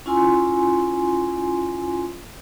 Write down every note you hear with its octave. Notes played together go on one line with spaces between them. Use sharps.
C#4 E4 F4 G#5 C6